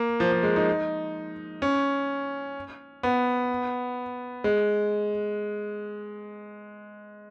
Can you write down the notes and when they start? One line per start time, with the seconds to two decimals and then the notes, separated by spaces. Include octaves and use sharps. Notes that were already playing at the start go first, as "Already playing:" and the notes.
Already playing: A#3
0.20 F3
0.32 F3
0.43 G#3
0.56 D#4
1.62 C#4
3.03 B3
4.44 G#3